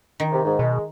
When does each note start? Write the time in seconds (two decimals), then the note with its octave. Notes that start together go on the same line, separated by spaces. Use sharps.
0.20 D#3
0.32 C3
0.45 G#2
0.59 B2 G#3